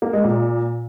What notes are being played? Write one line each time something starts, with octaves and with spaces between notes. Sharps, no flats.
A#3
G#3
A#2